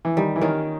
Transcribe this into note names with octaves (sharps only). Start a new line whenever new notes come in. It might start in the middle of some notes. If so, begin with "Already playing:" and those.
E3
D#3 G3
E3
D#3 A#3 C#4 F4